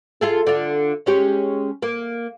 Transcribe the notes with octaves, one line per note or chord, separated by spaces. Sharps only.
F4 G#4 A4
D3 F4
G#3 C#4 G4
A#3